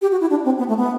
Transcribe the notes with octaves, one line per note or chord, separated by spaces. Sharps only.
G4
F#4
E4
D4
C4
B3
A3
B3